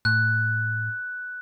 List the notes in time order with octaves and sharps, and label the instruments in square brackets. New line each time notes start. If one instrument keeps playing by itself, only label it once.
[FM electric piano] A2 [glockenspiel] F#6